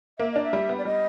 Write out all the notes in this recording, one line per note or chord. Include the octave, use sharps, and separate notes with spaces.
A#3 E5
D4 D#5
E5
G3
B3
D5
G3 D#5